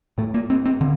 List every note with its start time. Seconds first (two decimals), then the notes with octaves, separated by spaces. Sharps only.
0.18 A2 A3
0.34 A#3
0.50 C4
0.66 C4
0.81 D3